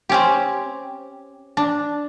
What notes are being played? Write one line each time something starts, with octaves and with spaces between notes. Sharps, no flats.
C4 C#4 G4
D4